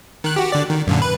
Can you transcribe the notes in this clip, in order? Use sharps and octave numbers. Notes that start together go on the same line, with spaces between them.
D#3 F#6
F#4 G4
D3 D5
D#3
F#2 A#2 D3
B4